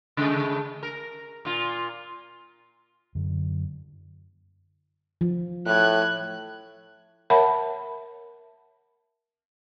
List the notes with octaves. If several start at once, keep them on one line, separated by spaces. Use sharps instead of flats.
C#3 G#3 A3
A#4
A#2 F4
F#2 D3
F3
A2 F#6 G#6
A#4 C#5 E5 F#5 A5 B5